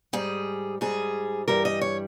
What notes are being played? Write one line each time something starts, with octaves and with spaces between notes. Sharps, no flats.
G#2 G3 G#4
G#2 G3 G#4
G2 E3 G3 A#4
D#5
C#5